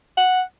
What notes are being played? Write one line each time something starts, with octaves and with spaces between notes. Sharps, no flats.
F#5